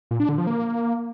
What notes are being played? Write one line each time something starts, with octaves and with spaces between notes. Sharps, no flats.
A#2
D4
D3
F3
A#3